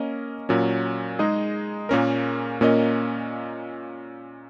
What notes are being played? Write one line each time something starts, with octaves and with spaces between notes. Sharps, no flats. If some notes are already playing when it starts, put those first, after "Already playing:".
Already playing: A#3 C#4 A#4 D#5
A#2 F#3 C#4
G#3 D#4 G#4 D#5
A#2 A#3 C#4 A#4
A#2 A#3 C#4 A#4 D#5